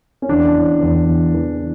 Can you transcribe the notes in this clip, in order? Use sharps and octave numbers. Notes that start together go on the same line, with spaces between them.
C#4
E2 D4
E3
E2
E2
E3